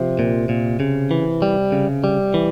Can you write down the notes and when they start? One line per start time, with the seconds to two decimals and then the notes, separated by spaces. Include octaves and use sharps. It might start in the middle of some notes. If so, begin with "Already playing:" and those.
Already playing: C3 F3
0.19 A#2
0.49 A#2
0.80 C#3
1.11 E3
1.42 G3
1.72 C#3
2.04 G3
2.34 E3